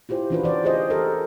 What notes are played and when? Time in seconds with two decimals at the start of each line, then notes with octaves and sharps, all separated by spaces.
0.09 E4 F4 G4 C5
0.30 E3 C#4 D4 F4 F#4 B4
0.43 E3 C5 D5
0.64 F4 G4 G#4 C5 D#5
0.90 G4 A4 A#4